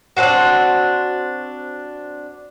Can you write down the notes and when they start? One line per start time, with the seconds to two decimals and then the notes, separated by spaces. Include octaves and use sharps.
0.17 C4 D4 F4 F#4